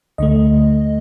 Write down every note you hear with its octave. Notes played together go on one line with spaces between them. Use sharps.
D2 D3 A3 D#5